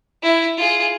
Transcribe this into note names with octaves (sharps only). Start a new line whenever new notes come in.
E4
F4 G#4